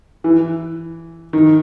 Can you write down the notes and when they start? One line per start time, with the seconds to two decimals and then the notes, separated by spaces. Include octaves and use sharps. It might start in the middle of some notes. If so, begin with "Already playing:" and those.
0.24 E3
1.33 D#3